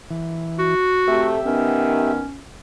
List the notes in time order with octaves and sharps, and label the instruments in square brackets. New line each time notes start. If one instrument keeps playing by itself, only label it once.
[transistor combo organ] E3
[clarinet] F#4
[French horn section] C3 A3 [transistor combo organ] G4 E5
[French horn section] D#3 B3 [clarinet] C#4